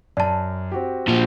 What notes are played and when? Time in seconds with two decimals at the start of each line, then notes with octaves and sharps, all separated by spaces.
0.17 F#2 D5 A5
0.72 C4 F#4 G4
1.08 A#2 F3